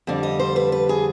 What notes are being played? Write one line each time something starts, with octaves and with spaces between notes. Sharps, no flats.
F2 D3 G3
D#5
C5
B4
B4
G#4